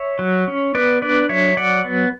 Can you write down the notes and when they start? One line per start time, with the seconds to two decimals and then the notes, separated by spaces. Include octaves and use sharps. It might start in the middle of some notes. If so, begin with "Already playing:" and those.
Already playing: C#5 E5
0.19 F#3
0.48 C#4
0.75 B3 B4 D5
1.02 D4 B4 D5
1.29 F#3 C#5 E5
1.57 F#3 D5 F#5
1.85 B3